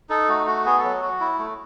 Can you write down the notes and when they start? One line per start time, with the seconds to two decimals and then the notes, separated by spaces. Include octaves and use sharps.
0.09 D#4 A4
0.29 A3 F#4
0.47 F#4
0.66 B3 G#4
0.78 A4
0.84 F#3
1.02 F#4
1.20 E4
1.39 A3